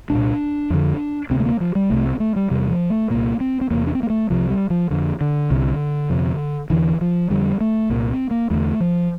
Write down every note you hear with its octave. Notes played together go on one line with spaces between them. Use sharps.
C2 A#2 D4
F2 D3
D2 C3 C4
A3
A#3
F3
G3
C2 C3 A3
C4
A3
G3
E2 C3 G3
F3
A3
C2 A#2 A#3
C4
C4
E2 C3 A#3
D4
C4
A#3
A3
C2 C3 F3
G3
F3
F2 D3
D3
C2 C3
F2 C3
E2 D3 E3
F3
F2 D3 G3
A3
C2 A#2 A#3
C4
A#3
E2 D3 A3
F3